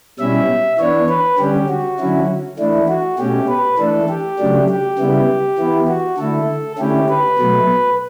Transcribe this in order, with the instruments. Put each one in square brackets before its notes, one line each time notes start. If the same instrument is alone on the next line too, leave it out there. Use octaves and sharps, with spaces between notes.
[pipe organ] B2 G3 C#4 E4 E5
E3 B3 D4 C#5
B4
D3 G3 C#4 G4
F#4
D3 F#3 C#4 E4
E3 A3 D4 E4
F#4
B2 A3 C#4 G4
B4
E3 A3 D4 A4
G4
C#3 F#3 A3 D4
G4
C#3 G3 B3 E4
E3 B3 E4
F#4
D3 A3 E4 A4
D3 A3 C#4 E4 G4
B4
B2 F#3 A3